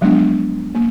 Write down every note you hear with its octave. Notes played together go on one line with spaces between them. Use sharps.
F3 F#3 G#3 B3 D4
A#3